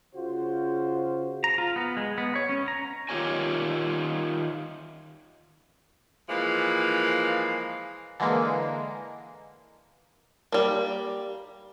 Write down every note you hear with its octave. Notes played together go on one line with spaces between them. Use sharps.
C#3 F4 F#4 C5
A#5
F4
B3
G#3
B3
C#5
C#4
A#5
D#3 F4 G4 C#5 G#5
E3 F3 G#3 A#3
D3 E3 G#3 A#3
G3 A#3